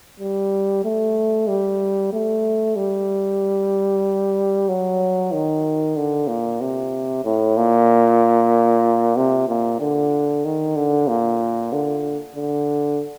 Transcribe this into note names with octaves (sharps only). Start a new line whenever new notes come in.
G3
A3
G3
A3
G3
F#3
D#3
D3
A#2
C3
A2
A#2
C3
A#2
D3
D#3
D3
A#2
D3
D3